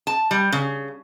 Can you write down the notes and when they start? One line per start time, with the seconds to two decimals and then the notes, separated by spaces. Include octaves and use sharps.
0.07 A5
0.31 G3
0.52 C#3